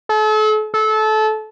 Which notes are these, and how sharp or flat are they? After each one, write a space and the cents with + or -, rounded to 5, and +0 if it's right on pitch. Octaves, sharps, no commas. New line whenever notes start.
A4 -40
A4 -25